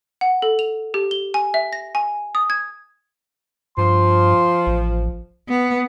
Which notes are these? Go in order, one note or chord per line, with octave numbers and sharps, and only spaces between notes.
F#5
A4
F7
G4
G7
G#5
E5
A#6
G#5
D#6
G#6
G2 F3 C6
A1
B3